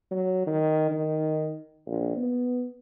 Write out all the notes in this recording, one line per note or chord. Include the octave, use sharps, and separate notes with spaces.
F#3
D#3
D#3
A#1
B3